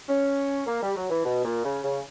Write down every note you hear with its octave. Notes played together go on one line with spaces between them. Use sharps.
C#4
A#3
G3
F#3
E3
B2
A#2
C#3
C#3